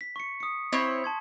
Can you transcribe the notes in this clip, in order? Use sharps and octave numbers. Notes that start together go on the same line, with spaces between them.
B6
C#6 C#7
D#6 C#7
C4 E4 C#5 C#6 B6
A5 C6 G#6